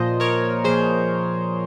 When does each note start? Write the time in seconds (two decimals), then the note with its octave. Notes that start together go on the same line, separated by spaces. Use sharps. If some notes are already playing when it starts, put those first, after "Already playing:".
Already playing: A#2 F3 C5 D#5
0.20 A#4 C#5
0.64 A#2 F3 G#4 C5